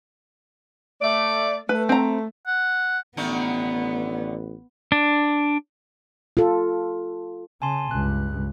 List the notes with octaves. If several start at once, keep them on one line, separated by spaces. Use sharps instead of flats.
A3 D5
A3 B4
C4 A#5
F#5
A1 D3 D#3 A3 B3
D4
F4 A4
C#3 G#5 A5 C6
C#2 G2 F#6